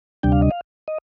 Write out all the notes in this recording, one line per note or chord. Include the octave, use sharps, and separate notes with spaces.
D2 C3 G3 D4 G5
F5
D#5
F5
D#5